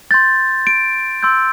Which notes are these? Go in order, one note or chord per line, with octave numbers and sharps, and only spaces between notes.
C6 G6 A6
D7
C6 E6 G6